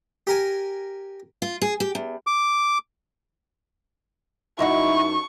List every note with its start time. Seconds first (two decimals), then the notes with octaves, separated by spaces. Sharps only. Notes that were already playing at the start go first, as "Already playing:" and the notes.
0.27 G4 A#4 G#5
1.42 F4
1.62 G#4
1.80 G4
1.95 E2
2.27 D6
4.59 F#2 D#4 E4 F#4 C#6